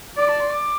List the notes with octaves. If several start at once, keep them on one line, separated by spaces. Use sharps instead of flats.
D5 D6
A5
C6
D6